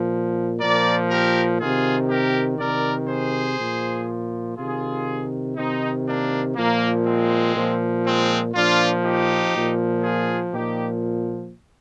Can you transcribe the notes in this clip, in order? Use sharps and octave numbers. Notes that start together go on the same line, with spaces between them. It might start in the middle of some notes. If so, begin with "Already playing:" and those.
Already playing: A#2 F3
A#2 F3 A#4 D5
G4 A#4
C3 D#3 F4 G#4
G4 A#4
C3 D#3 A#4 D5
G#4 C5
A#2 F3
C3 D#3 F4 G#4
C3 D#3 C4 D#4
A#3 D4
A#2 F3 A#3
G#3 C4
A#2 F3
G#3 C4
A#2 F3 D4 F4
D#4 G4
A#2 F3
F4 G#4
A#2 F3 D#4 G4